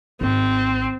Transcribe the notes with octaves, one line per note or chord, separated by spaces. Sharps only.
G#1 C4